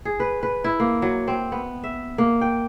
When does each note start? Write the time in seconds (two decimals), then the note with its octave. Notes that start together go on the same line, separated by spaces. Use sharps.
0.05 G#4
0.20 B4
0.43 B4
0.64 E4
0.80 A#3
1.02 F#3
1.27 C4
1.52 B3
1.83 E5
2.18 A#3
2.41 G5